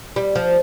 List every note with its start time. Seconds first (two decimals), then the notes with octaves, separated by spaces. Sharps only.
0.16 G3
0.35 F3